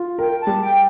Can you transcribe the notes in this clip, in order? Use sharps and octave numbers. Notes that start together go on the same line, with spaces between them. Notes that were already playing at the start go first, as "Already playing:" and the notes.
Already playing: F4
A#4 G5
A5
G3
G5